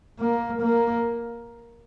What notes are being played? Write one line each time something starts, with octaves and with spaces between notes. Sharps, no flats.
A#3
A#3